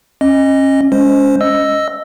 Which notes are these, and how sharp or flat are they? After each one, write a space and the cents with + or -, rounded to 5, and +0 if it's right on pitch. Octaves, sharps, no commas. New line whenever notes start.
C#4 -30 D#5 +0
G#3 +0 C#4 +15 C5 +0
D#5 +0 E6 +0